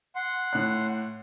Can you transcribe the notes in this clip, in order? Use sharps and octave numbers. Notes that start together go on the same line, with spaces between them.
F#5 C6
A2 F#6